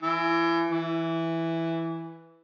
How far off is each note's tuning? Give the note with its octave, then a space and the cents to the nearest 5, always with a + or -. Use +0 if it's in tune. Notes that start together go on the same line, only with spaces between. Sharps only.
E3 +25
E3 +0